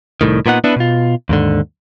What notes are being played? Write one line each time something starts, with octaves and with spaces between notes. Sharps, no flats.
C2 A2 D#3
A#2 B3 D#4 F#5
B3 D4 E4 B4
B2 F4
D#2 G#2 D3